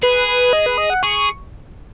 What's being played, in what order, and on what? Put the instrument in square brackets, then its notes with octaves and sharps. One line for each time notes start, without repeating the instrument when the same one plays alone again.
[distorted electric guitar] G#4 [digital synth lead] B4
[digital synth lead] B4
D#5
B4
D#5
F#5
[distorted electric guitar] G#4 [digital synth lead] C#6